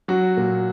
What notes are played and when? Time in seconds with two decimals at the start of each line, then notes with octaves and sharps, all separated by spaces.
0.08 F#3 F#4
0.37 A#2